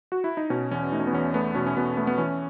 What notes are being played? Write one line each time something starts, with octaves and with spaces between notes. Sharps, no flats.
F#4
E4
D#4
B2 C#4
E2 C#4
A3 D#4
C#4
B3
E2 C#4
A3 B3
B2 C#4
C#4
B2 B3
A3 B3
B3
E3 C#4